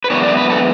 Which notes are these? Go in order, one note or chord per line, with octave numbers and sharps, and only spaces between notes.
B4
F#2 E3 G#3 B3 D4 C#5
D5
B4
A4